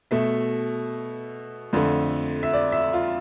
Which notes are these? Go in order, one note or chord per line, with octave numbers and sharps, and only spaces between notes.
B2 A3 E5
F2 D3 A3
E5
D5
E5
F4